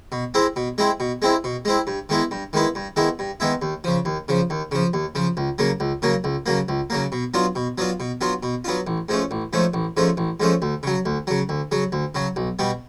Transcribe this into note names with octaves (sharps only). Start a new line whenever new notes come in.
B2
G#3 C4 E4
B2
G#3 C4 E4
B2
G#3 C4 E4
B2
G#3 C4 E4
G2
D#3 G#3 B3 E4
G2
D#3 G#3 B3 E4
G2
D#3 G#3 B3 E4
G2
D#3 G#3 B3 E4
D#2
C#3 F3
D#2
C#3 F3
D#2
C#3 F3
D#2
C#3 F3
C#2
C#3 F#3 A#3
C#2
C#3 F#3 A#3
C#2
C#3 F#3 A#3
C#2
C#3 F#3 A#3
B2
F#3 B3 D4 F4
B2
F#3 B3 D4 F4
B2
F#3 B3 D4 F4
B2
F#3 B3 D4 F4
A1
G#2 F3 A3 C#4
A1
G#2 F3 A3 C#4
A1
G#2 F3 A3 C#4
A1
G#2 F3 A3 C#4
D2
C#3 F#3
D2
C#3 F#3
D2
C#3 F#3
D2
C#3 F#3
B1
B2 G3 B3